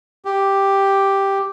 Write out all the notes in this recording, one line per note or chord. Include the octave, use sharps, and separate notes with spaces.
G4